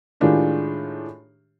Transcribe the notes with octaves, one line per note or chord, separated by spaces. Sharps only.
A2 D#3 G#3 D4 F4 G4